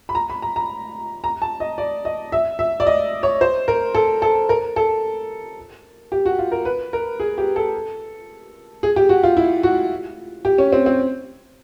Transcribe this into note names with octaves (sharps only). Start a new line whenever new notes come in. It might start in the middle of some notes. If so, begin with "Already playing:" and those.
B5
A#5
B5
A#5
A#5
A#5
A5
D#5
D5
D#5
E5
E5
D5
D#5
C#5
C5
A#4
A4
A4
A#4
A4
G4
F#4
F4
A#4
B4
A#4
G#4
G4
A4
G#4
G4
F#4
F4
E4
F#4
G4
C#4
C4
C4